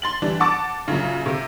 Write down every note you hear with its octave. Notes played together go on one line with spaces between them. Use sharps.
C6 A6 F#7
E3 G3 D4
F#5 A5 D6 A6
F#2 A#2 C#3
C3